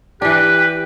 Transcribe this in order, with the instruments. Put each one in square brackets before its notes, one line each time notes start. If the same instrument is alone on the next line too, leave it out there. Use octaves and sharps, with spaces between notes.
[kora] E3 D4 [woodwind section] G4 G5 [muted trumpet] B4